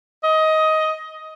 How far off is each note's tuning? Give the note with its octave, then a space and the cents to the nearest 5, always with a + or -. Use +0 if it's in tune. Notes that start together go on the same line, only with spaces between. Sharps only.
D#5 +15